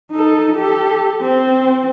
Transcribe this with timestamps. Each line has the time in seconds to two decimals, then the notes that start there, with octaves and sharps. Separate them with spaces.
0.11 D#4 A4
0.56 G4 A4
1.22 C4